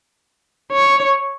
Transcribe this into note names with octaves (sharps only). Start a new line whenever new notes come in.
C#5